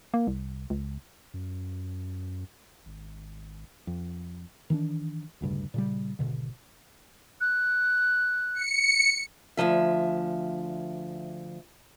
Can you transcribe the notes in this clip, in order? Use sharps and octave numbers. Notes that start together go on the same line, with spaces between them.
A#3
C2
C#2
F#2
G#1
F2
D#3 E3 C4 D4
E1 D2 G2 C#3
A#2 C#3 G3
G#1 E2 B2 D3
F#6
C#7
D2 G2 F3 E5